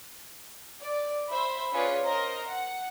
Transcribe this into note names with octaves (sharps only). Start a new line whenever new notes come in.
D5
C5 E5 B5
C#4 F4 G#4 B4 C#5 D5
A#4 C5 D#5 A#5
F#5